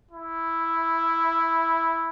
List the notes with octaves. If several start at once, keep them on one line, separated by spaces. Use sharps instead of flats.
E4